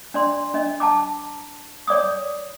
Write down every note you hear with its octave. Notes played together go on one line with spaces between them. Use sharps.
D4 D5 C6
D4 D#5
A5 A#5 D6
C#5 D5 D6 D#6